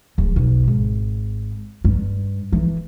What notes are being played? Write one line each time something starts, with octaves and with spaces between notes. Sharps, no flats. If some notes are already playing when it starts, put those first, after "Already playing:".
D1
B1
G#1
G2
E3